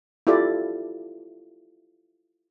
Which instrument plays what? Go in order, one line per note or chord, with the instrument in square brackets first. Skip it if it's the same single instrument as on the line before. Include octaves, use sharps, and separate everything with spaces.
[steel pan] E4 F4 G4 A4 D5